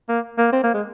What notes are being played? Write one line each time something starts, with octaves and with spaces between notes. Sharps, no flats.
A#3
A#3
C4
A#3
G#3